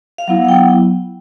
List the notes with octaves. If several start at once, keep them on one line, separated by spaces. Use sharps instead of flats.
F5
F#3 B3 E4 F#5
F#5
G5